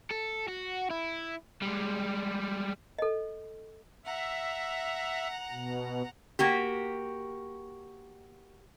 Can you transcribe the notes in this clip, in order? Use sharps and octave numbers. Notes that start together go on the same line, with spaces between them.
A4
F#4
E4
G3 G#3
A4 D#5
E5 F#5 A#5
B2
A#3 F#4 G4